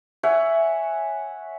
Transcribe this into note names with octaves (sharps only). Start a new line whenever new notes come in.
C#5 E5 F#5 G#5